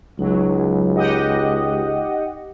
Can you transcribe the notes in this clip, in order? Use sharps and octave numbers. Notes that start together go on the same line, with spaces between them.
C#2 F#3 D#4
G4 D#5 F#5